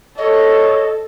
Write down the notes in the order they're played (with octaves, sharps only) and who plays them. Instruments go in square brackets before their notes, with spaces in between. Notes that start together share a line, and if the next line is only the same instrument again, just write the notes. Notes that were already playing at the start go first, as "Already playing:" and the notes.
[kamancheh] A4 [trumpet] C#5 [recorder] D#5